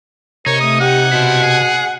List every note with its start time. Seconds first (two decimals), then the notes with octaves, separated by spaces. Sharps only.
0.46 C3 D#4 A#4 C#5 G#6
0.60 A3 D#6
0.80 G4 F#5
1.12 B2 E4 C5
1.43 G#4